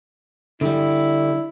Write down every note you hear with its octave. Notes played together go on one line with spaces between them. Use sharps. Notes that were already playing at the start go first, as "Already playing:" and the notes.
D3 G3 E4